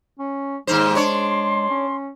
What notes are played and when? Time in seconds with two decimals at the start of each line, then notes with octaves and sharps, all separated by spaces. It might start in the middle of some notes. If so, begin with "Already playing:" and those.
0.19 C#4
0.67 D#2 G#2 G#3 C5
0.95 D4 C#5 C6
1.70 C#4